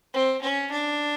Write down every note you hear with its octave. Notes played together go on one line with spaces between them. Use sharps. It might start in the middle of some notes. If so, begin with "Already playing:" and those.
C4
C#4
D4